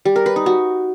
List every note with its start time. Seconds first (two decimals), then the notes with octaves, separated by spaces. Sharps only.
0.05 G3
0.16 A#4
0.26 B4
0.36 D#4
0.46 F#4